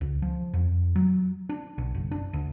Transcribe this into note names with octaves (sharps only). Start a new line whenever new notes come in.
C#2
F3
F2
F#3
D4
B1
F#1
D4
D2